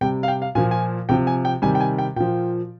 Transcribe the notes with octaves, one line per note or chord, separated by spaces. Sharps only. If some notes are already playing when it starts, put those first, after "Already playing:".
C3 G3 G5
F5
G5
F5
A#2 F3 G#5
G#5
C3 F3 G5
G#5
G5
C3 D#3 G3 G#5
G5
G#5
G5
A#2 F3 G5